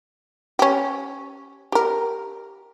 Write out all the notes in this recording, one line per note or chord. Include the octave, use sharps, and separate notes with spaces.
C#4 G4
G4 A#4